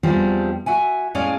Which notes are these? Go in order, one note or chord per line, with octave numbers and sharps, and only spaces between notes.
E2 F3 G3 C4 D4 G#4
F#4 E5 G#5
A2 G#3 C#4 G#4 D5 F5